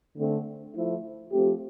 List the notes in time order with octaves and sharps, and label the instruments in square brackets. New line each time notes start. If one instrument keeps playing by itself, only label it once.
[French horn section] D3 A3 C4
F3 A3 E4
F3 A3 C4 G4